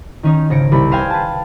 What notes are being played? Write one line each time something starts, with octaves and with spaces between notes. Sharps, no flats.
D#3 C#4 D#4
G#1 C#3 A#6 C#7 D7
C2 G3 B5
B4 C5 F5 G5 G#5
B4 A5